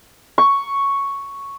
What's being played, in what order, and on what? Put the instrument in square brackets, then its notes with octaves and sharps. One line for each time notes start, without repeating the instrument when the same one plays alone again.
[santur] C#6